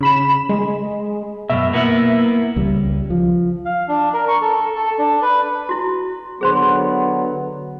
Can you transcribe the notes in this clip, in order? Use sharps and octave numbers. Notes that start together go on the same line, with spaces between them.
C#3 B5 E7
G#3
F#2 B2 E5
A#3 B3 E4
C#2 G3
F3
F5
D4
A#4
C#6
A4
A4
D4
B4
E4 F#4
D3 F#3 B3 G#4 C5 C6